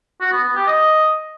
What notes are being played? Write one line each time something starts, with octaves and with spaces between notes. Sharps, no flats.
F#4
B3
B3
G4
D#5